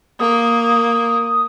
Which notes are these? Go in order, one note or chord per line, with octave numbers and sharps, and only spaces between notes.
A#3 D#6